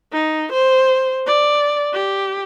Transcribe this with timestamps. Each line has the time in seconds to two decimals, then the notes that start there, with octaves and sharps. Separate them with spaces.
0.12 D#4
0.52 C5
1.27 D5
1.93 G4